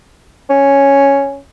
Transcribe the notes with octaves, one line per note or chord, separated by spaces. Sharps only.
C#4